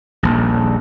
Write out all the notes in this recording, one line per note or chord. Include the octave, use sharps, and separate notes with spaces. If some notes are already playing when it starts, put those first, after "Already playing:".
D#1 A#1